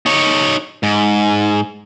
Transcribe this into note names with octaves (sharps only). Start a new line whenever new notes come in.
D#4 C#5
G#2